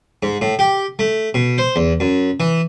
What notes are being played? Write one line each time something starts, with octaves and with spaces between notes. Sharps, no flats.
G#2
A2
G4
A3
B2
C5
E2
F#2
E3